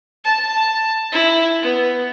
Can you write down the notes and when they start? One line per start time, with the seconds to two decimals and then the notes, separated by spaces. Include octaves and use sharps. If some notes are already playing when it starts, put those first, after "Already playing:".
0.25 A5
1.12 E4
1.62 B3